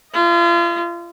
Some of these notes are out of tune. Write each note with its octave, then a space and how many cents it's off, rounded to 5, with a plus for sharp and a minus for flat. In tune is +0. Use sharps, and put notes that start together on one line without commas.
F4 -35 D#5 +0